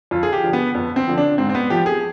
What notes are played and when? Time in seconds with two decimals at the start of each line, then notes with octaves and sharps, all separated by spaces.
0.11 F2 F4
0.23 G#4
0.33 G4
0.43 D3 F3
0.53 B3
0.75 F2 B3
0.96 C4
1.07 D3 F3
1.18 D4
1.38 G#2 C4
1.49 C4
1.55 B3
1.70 F3 G4
1.86 G#4